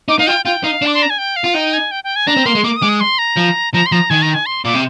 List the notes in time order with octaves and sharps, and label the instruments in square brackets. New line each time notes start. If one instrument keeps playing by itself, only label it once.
[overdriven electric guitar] D#4 [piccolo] D6
[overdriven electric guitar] D#4 [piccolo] F5
[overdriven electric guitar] F4 [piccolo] G5
[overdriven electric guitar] F4 [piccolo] G5
[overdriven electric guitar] D#4 [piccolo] F5
[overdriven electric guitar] D4 [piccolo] D6
[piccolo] C6
A#5
G#5
G5
F5
[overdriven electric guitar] F4
[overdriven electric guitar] D#4 [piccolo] G5
[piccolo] G#5
G5
G5
G#5
[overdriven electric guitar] D4 [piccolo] A#5
[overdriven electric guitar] C4
[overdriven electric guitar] A#3 [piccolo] C6
[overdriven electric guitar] G#3
[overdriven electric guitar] A#3 [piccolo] D6
[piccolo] D#6
[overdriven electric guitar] G#3 [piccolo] D6
[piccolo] D#6
C6
A#5
[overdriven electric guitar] F3
[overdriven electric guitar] F3 [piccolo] A#5
[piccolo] C6
[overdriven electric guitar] F3 [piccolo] A#5
[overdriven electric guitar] D#3 [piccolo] G#5
[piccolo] A#5
G#5
C6
[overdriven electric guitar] A#2 [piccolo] D6
[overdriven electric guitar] C3